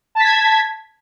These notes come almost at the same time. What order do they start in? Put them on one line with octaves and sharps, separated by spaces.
A5 B6 G#6